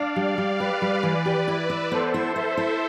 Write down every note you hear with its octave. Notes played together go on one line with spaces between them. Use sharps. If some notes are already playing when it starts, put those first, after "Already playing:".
Already playing: D4 D5 F5
G3
G3
G4 B4 D5
G3
E3
G4
E4
E4
B3 A4 C5
E4
E4 C5 E5
E4